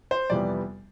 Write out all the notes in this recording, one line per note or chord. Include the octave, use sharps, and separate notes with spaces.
C5
F2 C3 E3 G3 B3 D5